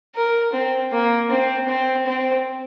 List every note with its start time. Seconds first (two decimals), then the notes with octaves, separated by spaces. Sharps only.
0.15 A#4
0.53 C4
0.92 A#3
1.30 C4
1.68 C4
2.07 C4